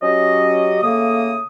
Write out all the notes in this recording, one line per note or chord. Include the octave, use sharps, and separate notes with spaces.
F#3 C#4 G4 D#5
C#3 A3 A#3 D#6